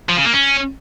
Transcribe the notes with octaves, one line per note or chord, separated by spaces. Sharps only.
F3
C#3
A#3
C#4